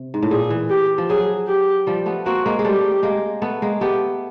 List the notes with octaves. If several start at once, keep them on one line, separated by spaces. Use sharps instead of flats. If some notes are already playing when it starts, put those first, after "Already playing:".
Already playing: C3
G#2
A2
A#2 G#4
E3
G4
F3
F#3 G#4
G4
F3 G3
A3 B3
A#3 C4 F#4
G#3 A#3
G#3
G3 A3 G4
G#3 A#3
A3 B3
G#3 A#3
A3 B3 G4